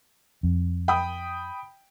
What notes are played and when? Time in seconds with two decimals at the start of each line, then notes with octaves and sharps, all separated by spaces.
0.43 F2
0.88 G5 B5 D#6